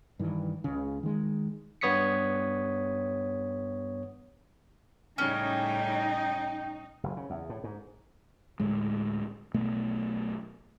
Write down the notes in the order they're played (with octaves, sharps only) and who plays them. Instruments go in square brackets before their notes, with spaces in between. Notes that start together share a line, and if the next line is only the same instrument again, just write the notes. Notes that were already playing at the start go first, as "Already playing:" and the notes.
[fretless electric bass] G2 D#3 E3
C#2 C#3
D#3 G#3
[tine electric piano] G2 B3 C#5 D#6 B6 C#7
[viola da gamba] A2 C#3 G3 [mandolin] C#4 [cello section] D#4 [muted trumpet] G5
[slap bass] F#1
C#3
E2
A2
G#2
[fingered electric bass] D2 A2 G#3
B1 B2 A3 B3